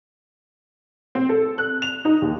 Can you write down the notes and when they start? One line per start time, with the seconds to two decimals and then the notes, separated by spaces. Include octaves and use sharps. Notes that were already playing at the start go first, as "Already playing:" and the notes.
1.15 C4
1.29 A4
1.58 F#6
1.82 F7
2.05 D#4
2.22 D#2